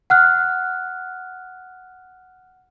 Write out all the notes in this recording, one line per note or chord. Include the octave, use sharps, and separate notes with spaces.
F#5 F6 F#6